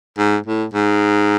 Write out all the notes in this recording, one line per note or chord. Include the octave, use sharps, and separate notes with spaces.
G#2
A2
G#2